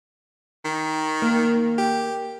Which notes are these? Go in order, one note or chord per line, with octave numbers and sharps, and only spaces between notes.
D#3
A#3
G4